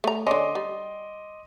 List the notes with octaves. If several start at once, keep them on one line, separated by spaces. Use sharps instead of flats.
A3 A#5
D3 C#4 D#5 C6 D6
G3